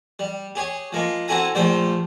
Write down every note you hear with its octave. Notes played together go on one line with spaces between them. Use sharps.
G3
G4 G#4 C#5
F3 G#3 A#3
C4 E4 F#4 A4 G#5 A#5
A#1 F3 G3 A3 C5 G5